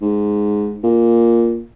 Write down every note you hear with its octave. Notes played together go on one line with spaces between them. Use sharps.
G#2
A#2